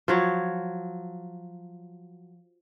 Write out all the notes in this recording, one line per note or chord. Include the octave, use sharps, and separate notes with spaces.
F3 F#3 C#5